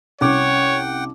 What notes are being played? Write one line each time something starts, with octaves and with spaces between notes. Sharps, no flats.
C2 C#4 C#5 F#5 G5 D6